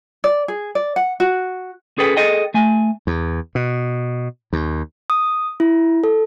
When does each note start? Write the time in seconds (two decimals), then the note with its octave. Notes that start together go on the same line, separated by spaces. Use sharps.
0.24 D5
0.48 G#4
0.75 D5
0.96 F#5
1.20 F#4
1.98 C#4 G#4 A4 B4 G5
2.17 G#4 A4 D#5 G5
2.54 A3 G#5
3.07 E2
3.55 B2
4.53 D#2
5.10 D#6
5.60 E4
6.04 A4